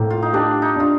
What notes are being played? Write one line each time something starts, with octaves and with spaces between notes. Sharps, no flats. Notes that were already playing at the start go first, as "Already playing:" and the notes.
Already playing: A2 A#3 C4
F4
D#4
D4 G4
D#4
D4 F4